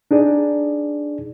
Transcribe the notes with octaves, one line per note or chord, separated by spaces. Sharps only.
D4 D#4 G#4 D5